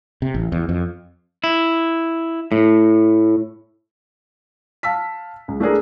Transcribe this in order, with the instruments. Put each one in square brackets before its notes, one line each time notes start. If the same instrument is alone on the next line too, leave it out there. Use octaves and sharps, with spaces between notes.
[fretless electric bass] C3
A1
E2
F2
[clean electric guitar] E4
A2
[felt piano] F5 A5 E6 B6
C#2
A3 D4 G#4 A#4